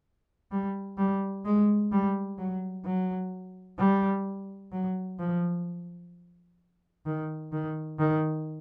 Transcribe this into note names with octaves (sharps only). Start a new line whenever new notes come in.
G3
G3
G#3
G3
F#3
F#3
G3
F#3
F3
D#3
D#3
D#3